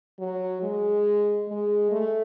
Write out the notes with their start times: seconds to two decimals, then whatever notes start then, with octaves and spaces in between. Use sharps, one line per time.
0.19 F#3
0.62 G#3
1.48 G#3
1.91 A3